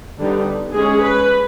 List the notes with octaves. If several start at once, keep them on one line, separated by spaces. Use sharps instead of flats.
D3 G3 B3 D#4
G#3 C#4 G#4
B4